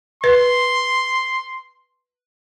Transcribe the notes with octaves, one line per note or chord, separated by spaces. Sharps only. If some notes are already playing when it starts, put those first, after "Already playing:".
B4 C6